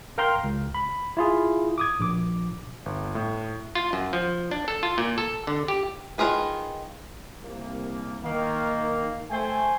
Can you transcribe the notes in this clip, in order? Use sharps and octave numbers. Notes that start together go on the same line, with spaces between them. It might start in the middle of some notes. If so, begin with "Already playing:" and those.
A#4 F5 G5 A#5 C6 F6
C#2
B5
E4 F4 G#4
D6 D#6 G#6
A#1 D6
G1
A2
F4
F#2
F3
D4
A4
F4
A#2
A4
D3
G4
D#3 E4 F4 G#4 B4
C2 A#3
D#3 A#3
A3 C5 G5 G#5